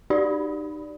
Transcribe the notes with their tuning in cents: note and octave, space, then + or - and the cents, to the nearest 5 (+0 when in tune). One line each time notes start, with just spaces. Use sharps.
D#4 -30 G4 -5 D5 +0